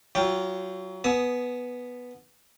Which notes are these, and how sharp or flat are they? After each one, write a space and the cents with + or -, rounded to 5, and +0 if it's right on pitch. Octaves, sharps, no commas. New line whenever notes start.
F#3 +20 F4 -5 G5 +0
B3 +0 G#5 +35 D#6 +0